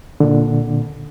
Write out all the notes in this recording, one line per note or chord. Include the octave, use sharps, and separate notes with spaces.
A#2 D3